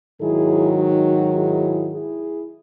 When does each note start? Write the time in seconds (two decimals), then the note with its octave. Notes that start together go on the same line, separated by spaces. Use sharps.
0.21 G#2 D#3 F#3 E4 G#4
0.78 D#4 F#4
1.35 E4 G#4
1.92 E4 G#4